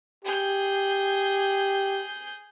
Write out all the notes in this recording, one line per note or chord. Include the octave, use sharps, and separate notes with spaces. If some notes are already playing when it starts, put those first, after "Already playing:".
G4 G#4 G6